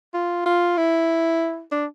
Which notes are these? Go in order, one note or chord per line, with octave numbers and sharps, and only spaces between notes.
F4
F4
E4
D4